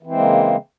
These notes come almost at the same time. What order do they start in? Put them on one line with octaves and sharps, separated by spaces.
E3 C4 G#3 A#3 C#3